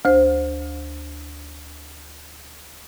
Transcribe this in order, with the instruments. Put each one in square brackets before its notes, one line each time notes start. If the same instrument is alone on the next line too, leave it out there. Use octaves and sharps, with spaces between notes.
[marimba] D2 C5